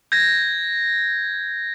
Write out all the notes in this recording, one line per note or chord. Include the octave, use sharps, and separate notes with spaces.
G6 G#6 A#6